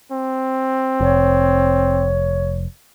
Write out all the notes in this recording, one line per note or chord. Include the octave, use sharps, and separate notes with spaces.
C4
F1 C#5